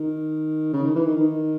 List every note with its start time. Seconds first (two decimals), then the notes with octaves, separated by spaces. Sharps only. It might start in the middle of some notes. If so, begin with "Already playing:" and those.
Already playing: D#3
0.73 C#3
0.83 D#3
0.95 E3
1.06 D#3
1.16 D#3